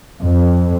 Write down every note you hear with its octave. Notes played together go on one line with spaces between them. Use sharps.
F2